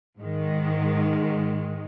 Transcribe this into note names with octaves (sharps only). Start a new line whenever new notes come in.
G#2 D#3 G#3